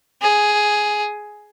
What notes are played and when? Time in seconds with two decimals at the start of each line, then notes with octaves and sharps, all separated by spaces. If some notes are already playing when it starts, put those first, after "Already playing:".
0.22 G#4